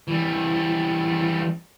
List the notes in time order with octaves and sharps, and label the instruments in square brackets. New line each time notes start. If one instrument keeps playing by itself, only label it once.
[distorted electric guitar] E3 G3